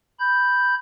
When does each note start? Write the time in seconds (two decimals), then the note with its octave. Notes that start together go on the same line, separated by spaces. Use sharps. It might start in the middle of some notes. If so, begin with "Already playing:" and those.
0.19 B5 G6